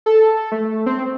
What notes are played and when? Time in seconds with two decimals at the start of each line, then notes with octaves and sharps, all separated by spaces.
0.06 A4
0.52 A3
0.86 C4